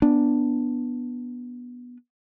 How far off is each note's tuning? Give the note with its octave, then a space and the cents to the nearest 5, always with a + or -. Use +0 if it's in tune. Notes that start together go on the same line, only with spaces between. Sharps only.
B3 -10 D4 +0